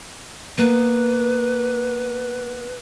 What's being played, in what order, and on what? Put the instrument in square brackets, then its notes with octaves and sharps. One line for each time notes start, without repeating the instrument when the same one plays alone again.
[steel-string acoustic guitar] A#3 B3 [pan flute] B4